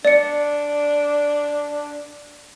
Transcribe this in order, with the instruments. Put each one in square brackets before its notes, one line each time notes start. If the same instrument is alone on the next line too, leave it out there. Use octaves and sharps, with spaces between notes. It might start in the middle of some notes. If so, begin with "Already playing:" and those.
[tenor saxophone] D4 [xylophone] D5 C#7